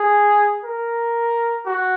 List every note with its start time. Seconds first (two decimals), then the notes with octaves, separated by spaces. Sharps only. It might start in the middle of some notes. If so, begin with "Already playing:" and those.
Already playing: G#4
0.64 A#4
1.66 F#4